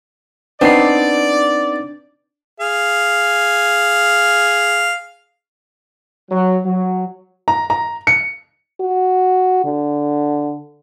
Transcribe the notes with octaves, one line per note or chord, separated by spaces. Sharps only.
B3 C4 D4 D#4 D5 C7
G#4 F5
F#3
F#3
A#5
A#5
C#7
F#4
D3